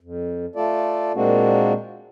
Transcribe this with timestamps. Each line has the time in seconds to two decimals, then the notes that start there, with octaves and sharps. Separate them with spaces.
0.01 F2
0.56 A3 F4 A4 D5
1.15 A#2 G#3 A#3 C4 D4 F#4